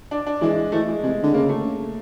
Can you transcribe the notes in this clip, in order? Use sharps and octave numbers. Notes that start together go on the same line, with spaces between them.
D4
D4
E3 G#3
E3 A3
G#3
C3 G#3
D3
C#3 A#3
A3